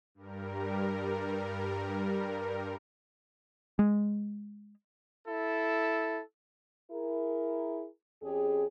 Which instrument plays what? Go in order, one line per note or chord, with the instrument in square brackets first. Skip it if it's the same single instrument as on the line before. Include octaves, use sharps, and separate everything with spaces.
[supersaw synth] G2 G3 A#4
[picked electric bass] G#3
[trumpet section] E4 A4
[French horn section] E4 G#4 A#4
F2 C#4 G4 G#4